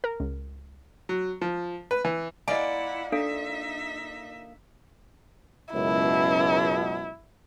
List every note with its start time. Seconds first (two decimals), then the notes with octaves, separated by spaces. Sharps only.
0.04 A#4
0.20 C#2
1.09 F#3
1.41 F3
1.91 B4
2.05 E3
2.48 A#3 E4 F4 D5 D#5 F#5 G#5
3.12 D4 D#4 A4 E5 F5
5.74 C#2 F#2 B2 E4